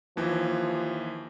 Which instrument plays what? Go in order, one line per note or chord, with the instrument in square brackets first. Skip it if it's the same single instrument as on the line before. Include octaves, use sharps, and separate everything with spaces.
[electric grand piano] D#2 E3 [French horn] F3